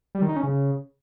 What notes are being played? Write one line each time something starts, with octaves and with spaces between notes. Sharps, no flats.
G3
D#3
D#4
C#4
C#3